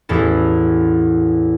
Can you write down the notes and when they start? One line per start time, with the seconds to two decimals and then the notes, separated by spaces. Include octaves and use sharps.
0.09 A1 E2 E4 A4